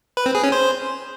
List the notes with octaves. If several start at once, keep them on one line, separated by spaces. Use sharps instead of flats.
B4
C4
G#4
C#4
C5